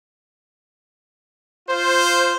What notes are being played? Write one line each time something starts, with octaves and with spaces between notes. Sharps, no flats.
F4 C5